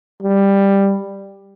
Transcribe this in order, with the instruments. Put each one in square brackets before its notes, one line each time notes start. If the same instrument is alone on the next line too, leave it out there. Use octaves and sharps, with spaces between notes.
[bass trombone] G3